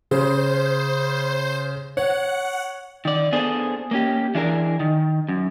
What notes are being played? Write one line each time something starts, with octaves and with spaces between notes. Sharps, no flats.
C#3 C5
C#5 F#5
D#3 D5
B3 D4 G#4 A4 C5
A#3 C#4 G4
E3 D4 G#4 A#4
D#3
F#2